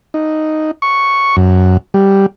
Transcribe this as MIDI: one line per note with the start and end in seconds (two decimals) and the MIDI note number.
0.14 0.71 63
0.82 1.36 85
1.37 1.77 42
1.94 2.26 55